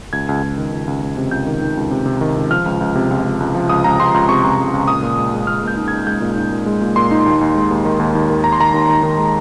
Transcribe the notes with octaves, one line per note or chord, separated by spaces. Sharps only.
C#2 G#6
C#2
C#2
D#3
C#2
C#2
C#2
C3
C#2 G6
D#3
D#3
C#2
C3
C3
D#3
C#2
F3 F6
C#2
C#2
C3
C#2
C#2
C#2
F3
C#2 D#6
C#2 A#5
C#2 C6
C#2 C6
C3 C#6
C#2
C#2
C#2
A#2 D#6
A#2
G#3
G#3
A#2 F6
A#2 G6
D#4
G#6
D#4
G#3 G6
A#2
D#4
A#2
G#3
A#2
A#2 C6
D#4
D#2
D#2
G#3
D#2
D#3
D#2
D#2
D#3
D#3 A#5
C6
D#3 A#5
D#2
D#3
D#3
G#3